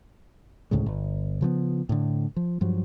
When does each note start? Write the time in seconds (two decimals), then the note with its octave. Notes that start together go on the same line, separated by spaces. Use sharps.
0.71 D2 A2 C#3 G#3
0.86 G1
1.41 C#3 F3 A#3 B3
1.89 A2 D3
2.36 F3
2.61 G2 F3 F#3